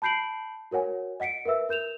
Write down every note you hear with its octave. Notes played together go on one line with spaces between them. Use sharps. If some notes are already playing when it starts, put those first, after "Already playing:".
A5 B5 G6 C7 D7 F#7
F#4 A#4 C#5 F#5 G#5
D#5 F#5 B6 C#7 D7
A#4 B4 E5 E6
A#4 G6 E7 F7